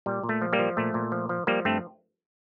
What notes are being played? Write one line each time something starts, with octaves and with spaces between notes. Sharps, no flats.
A#2 G3
A#2
A3
F3
G3 A#3
F3
A#2 A3
A#2
F3
F3
F3 G3 A#3
G2 A3 C4